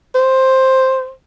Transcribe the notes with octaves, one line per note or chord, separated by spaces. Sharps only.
C5